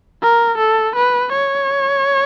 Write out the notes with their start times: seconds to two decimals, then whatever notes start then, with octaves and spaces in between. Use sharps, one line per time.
0.22 A#4
0.58 A4
0.95 B4
1.32 C#5